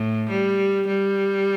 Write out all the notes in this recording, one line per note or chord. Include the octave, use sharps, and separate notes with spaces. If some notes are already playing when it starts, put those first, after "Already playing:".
Already playing: A2
G3
G3